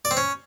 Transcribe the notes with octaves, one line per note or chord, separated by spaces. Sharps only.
D5
C4
C#4